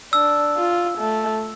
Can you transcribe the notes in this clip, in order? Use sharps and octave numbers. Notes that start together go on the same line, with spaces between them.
D4 E6
F4
A3